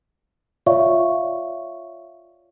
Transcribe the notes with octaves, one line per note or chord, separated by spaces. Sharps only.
F4 C#5 D5 E5 F5 C#6